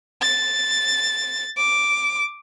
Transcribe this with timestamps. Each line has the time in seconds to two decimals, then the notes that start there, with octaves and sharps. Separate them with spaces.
0.22 A6
1.58 D6